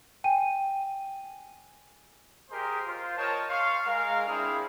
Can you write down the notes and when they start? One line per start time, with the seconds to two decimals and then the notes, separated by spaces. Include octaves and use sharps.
0.24 G5 G#5 D#7
2.50 G4 G#4 A#4 C5 D#5 C6
2.85 F4 C5
3.16 A#4 C#5 D#5 G5 A5
3.49 F5 C6 C#6
3.86 G#3 A#4 F5
4.27 C4 D4 E4 F4 G#4